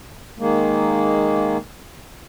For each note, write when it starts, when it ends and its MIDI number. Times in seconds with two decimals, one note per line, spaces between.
0.39 1.57 51
0.39 1.57 56
0.39 1.57 58